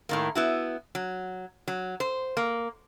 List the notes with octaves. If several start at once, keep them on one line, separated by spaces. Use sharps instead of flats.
A2 D#3 A#3
B3 E4 F#4
F#3
F#3
C5
A#3